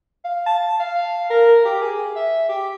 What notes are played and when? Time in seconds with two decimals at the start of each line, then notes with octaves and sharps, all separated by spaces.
0.25 F5
0.46 A5
0.80 F5
1.30 A#4
1.65 G4
1.81 G#4
2.16 E5
2.49 G4